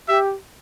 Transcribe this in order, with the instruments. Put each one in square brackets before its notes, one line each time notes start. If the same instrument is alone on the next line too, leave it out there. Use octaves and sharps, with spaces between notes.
[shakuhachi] G4 [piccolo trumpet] E5